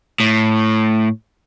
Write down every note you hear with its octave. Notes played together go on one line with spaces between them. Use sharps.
A2